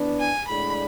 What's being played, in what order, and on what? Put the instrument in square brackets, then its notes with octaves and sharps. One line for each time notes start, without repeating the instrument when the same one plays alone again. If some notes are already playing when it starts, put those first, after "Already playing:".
Already playing: [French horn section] E3 B3 D4
[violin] G#5
[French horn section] A2 G#3 D4 G#4 D5 [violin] B5